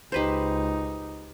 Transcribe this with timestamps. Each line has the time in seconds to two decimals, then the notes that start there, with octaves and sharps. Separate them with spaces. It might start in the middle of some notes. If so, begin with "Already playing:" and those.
0.12 C#2 D#4 G4 B4 C5